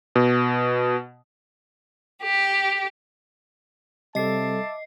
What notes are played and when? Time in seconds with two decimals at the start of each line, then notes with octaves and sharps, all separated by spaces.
0.16 B2
2.21 G4
4.15 C3 G3 A4 D#5 E5 A5 D6 C7